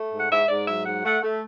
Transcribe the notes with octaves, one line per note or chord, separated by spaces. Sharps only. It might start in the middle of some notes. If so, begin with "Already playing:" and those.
Already playing: A3
G#2
F#5
G#2 E5
G#2 D5
F#3 E5
G#2 F#5
A3 F#5
A3